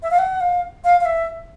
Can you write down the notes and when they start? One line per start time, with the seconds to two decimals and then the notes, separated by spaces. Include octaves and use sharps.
0.03 E5
0.11 F5
0.19 F#5
0.40 F5
0.84 F5
1.01 F5
1.05 E5